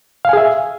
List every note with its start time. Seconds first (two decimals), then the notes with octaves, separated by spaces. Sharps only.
0.25 F5
0.29 G#5
0.33 G#4
0.37 E5